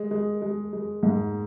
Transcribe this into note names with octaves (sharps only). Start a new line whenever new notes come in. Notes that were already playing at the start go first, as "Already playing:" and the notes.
Already playing: G#3
G#3
G#3
G#3
G#2